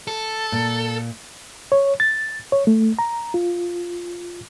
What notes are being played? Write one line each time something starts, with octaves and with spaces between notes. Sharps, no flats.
A4
A#2
C#5
A6
C#5
A3
A#5
F4